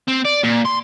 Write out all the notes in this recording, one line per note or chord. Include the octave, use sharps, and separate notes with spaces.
C4
D5
A#2
C6